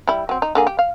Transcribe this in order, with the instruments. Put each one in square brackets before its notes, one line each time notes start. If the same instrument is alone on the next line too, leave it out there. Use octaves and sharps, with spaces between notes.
[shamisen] G3 E4
F#3 C4
D#4
D3 A#3 G#4
G4
F5